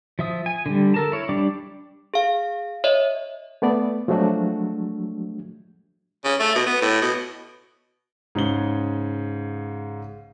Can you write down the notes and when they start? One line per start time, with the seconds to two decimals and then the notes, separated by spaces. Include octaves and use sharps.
0.19 F3 E5 D#6
0.46 G#5
0.66 D3 G3
0.94 A4 A#4 A5
1.12 E4 C#5
1.29 G3 D4 D5 D6
2.14 G#4 F5
2.84 C#5 D#5 E5
3.62 A3 B3 D5
4.08 F3 F#3 G#3 A3 D4 F#4
6.24 C#3
6.40 A3
6.55 B2
6.66 B3
6.81 A2
7.02 B2
8.35 G#2 C#3 G7